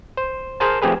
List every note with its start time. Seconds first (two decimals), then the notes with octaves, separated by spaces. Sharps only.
0.17 C5
0.60 G#4 A#4 C5 A5
0.82 F3 A3 C4 G4 G#4 B4